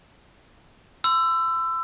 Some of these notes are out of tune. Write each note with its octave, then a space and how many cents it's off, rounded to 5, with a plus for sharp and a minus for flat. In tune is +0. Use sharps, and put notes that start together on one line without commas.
C6 -35 E6 +15